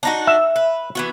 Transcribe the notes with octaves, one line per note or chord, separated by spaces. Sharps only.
D4 D#4 F#4
E5
B4
E3 B3 F#4